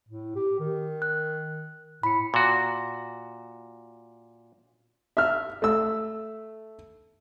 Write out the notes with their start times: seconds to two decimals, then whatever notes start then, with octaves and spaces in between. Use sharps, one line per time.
0.09 A2
0.35 G4
0.60 D#3
1.02 F#6
2.03 A2 B5 C#7
2.34 A#2 F#4
5.17 E5 F6
5.62 A3 E6